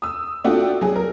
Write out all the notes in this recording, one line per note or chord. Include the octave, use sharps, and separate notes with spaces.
D#6 E6
A3 D4 F4 F#4 F#5 G5
F#3 G#4
A#4